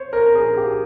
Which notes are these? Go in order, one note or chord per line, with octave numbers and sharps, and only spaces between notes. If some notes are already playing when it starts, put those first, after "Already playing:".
Already playing: C5 C#5
A#4
G#4
G4